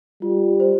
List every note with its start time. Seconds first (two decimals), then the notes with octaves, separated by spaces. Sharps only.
0.22 G3 F4
0.60 C5